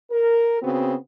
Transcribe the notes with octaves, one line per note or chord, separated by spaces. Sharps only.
A#4
C#3 B3 C4 F#4